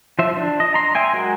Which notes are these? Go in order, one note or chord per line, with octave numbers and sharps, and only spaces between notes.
F3 C5 E5
D4
D#5
A#5 C6
E5 G5 G#5 C6
F#3 G#3 F#4 G#4 A#4